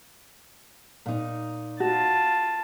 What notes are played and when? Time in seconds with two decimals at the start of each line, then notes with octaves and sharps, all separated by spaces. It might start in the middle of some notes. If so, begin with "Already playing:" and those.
1.06 A#2 D#4
1.80 F4 F#4 A5